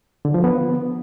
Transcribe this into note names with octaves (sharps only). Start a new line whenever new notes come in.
D3
F3
B3